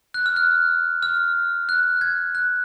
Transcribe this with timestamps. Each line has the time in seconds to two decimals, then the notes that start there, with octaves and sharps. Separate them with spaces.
0.14 F#6
0.26 F6
0.36 F#6
1.03 F6
1.69 F#6
2.01 G#6
2.35 F#6